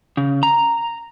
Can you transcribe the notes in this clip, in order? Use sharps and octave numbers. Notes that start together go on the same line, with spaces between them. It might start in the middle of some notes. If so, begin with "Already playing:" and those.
C#3
A#5